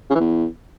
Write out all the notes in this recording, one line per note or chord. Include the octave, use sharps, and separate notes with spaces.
C#3
E3
E2